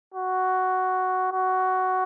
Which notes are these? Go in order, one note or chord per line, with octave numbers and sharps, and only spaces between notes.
F#4
F#4